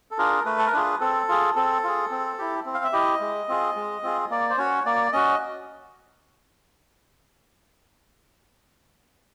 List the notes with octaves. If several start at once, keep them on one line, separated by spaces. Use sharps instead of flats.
A4
D4 F4 G#4 A#4
A3 B4
A4
A#4
D4 F4 G#4 B4
C4 A4
F4 G#4
C4 A4
F4 G#4
C4
E4 G4
C4
F5
E5
E4 G4 D#5
G#3
C4 F4 G#4
G#3
C4 F4 G#4
A#3 D5
C5
C#4 F#4 C#5
A#3 D5
C#4 F#4 D#5